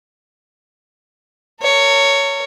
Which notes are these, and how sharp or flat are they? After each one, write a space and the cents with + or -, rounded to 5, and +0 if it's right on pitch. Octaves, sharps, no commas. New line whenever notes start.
A#4 -40 C#5 +10